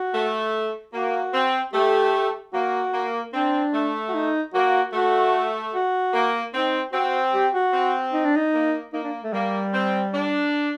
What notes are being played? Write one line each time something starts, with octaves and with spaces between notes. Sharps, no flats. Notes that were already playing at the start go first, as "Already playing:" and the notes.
Already playing: F#4
A3
A#3 F#4
C4
A3 G4
A#3 F#4
A#3
C4 D4
A3
F#4
D#4
A#3 F#4
A3 F#4
F#4
A#3
C4 D#4
C4 F#4
G4
F#4
C4
D#4
D4
D#4
A#3
A#3 D#4
D4
A3
G3 A#3
C4
D4